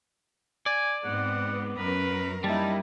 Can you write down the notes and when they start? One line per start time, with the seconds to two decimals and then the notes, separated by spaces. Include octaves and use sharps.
0.66 D5 G#5
1.05 G#2 B3 C4 F#5
1.77 F#2 A#4 B4
2.44 G3 A#3 D#4 E4 A5